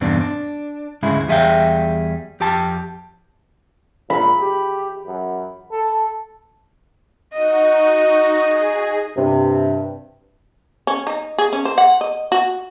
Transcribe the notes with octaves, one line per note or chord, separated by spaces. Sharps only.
E2 G2 B2 C4 D4
D4
D2 G#2 C#3 G#3 E4
E2 G3 G#4 E5 F5 G5
F2 G4 G5 A5
A#2 B5
G4
F#2
A4
D#4 F#4 D#5
G#4
G2 C3
C#4
D#4
G#4
C#4
C5
F#5
D#5
F#4